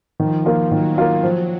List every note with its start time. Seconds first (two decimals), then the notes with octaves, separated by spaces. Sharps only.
0.20 D#3 F3
0.46 A#3 F4
0.71 D#3 F#3
0.98 A#3 F4
1.23 F3 F#3